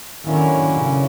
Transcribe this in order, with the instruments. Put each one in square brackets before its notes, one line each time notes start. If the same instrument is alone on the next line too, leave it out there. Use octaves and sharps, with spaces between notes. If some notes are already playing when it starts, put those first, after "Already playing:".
[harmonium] D3 F#3 A#3 C#4 E4 [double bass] D#3
[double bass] C#3